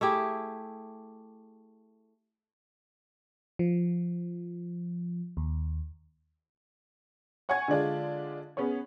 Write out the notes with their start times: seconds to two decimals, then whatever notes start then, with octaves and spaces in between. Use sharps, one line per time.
0.01 A3 E4 G4 G#4
3.59 F3
5.37 D#2
7.49 C#5 F#5 G#5 C#6 G#6
7.68 D3 G#3 D4 F4
8.57 B3 C#4 G#4 C#5